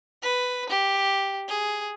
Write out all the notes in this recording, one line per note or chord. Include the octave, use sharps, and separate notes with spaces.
B4
G4
G#4